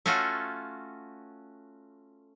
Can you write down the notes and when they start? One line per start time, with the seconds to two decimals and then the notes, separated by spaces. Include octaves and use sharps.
0.06 A3 C#4 F4 F#4 A4